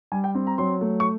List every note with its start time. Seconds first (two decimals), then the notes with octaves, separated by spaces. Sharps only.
0.12 G3 G#5
0.24 G5
0.35 C4
0.47 A#5
0.58 F#3 C6
0.81 A3
1.00 C#6